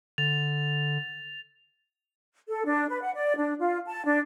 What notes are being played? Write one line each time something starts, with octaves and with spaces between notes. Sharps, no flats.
D3 A6 F7
A4
D4
B4
F#5
D5
D4
F4
A5
D4